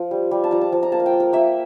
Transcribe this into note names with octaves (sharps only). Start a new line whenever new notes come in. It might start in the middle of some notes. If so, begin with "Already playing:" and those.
Already playing: F3
G3
G3
A5
F3 A#5
A5
F3 A5
A#5
A#3 A5
F5
G5
A#3
A#4
A#3 E5